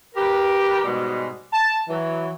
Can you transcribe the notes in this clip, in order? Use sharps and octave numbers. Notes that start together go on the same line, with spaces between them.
G4 A#4 B4
G#2 B2 G3 G#3
A5
E3 F#3